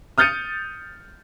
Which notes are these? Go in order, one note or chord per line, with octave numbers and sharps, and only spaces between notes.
D#6 F6 G6 A6 C#7 D#7